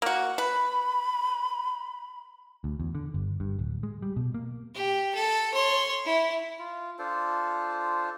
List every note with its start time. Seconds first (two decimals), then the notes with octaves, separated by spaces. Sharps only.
0.02 A#3 F#4
0.38 B4 B5
2.64 D2
2.80 E2
2.95 D3
3.14 G1
3.40 G2
3.59 D1
3.83 G#3
4.02 G3
4.16 B2
4.34 A#3
4.75 G4
5.14 A4
5.54 C#5 C6
6.06 E4
6.59 F4
6.99 D4 F4 A4 C5